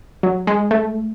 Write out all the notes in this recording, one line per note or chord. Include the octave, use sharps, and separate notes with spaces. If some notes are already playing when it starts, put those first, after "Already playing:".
F#3
G#3
A3